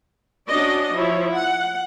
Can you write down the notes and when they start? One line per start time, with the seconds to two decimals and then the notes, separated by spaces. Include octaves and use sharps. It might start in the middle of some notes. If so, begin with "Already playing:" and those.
0.50 C#4 D4 F#4 D5 D#5
0.95 F3 E4 C#5
1.34 F#5